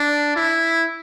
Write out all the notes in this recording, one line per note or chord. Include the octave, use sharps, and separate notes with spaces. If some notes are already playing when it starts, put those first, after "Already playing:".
Already playing: D4
E4